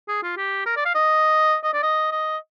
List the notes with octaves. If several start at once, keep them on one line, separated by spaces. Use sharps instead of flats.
G#4
F4
G4
A#4
D5
F5
D#5
D#5
D5
D#5
D#5